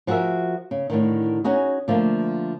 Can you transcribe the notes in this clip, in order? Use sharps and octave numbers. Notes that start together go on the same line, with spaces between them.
F3 F#4 G#4 A#4 E5
C#3
A2 D3 D#3
C#4 D#4 F#4 G#4
D3 F3 A3 A#3